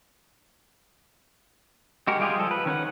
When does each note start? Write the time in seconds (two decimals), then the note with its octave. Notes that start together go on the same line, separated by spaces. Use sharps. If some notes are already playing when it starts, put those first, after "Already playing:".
2.07 G#3 F#4 G4 A#4
2.19 G3 G#3 F4 G4 G#4
2.37 F3 A4
2.51 B4
2.66 D#3 C#4 B4 F#5